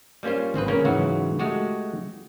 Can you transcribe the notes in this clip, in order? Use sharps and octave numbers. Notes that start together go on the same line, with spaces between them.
G3 A#3 C#4 F4 C5
G#1 C4 G#4 B4
C#3 A#3 C#4 A#4
G#2 C#3 E3 F#3 F#4
G#3 A3 F#4 G4